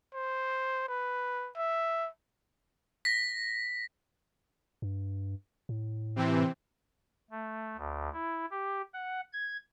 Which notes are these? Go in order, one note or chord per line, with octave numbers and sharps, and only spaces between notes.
C5
B4
E5
A#6 B6
G2
A2
C3 E3 C4
A3
D2
E4
G4
F#5
G#6